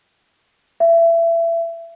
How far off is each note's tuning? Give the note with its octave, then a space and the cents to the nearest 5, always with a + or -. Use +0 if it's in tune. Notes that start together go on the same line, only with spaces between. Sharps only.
E5 +25